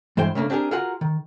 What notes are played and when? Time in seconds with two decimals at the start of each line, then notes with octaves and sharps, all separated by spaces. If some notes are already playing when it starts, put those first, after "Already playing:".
0.17 G2 E3 G#3 C5 G5
0.35 C#3 A3 A#3 D4
0.50 C4 D4 G4 G#4 A#4
0.71 F4 F#4 G#4 A#4 F#5
1.01 D#3